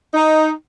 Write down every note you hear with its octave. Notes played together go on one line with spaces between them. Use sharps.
D#4